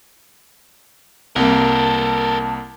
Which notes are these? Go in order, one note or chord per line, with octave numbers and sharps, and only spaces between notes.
C2 G3 A#3 C4 A4 A#4 A5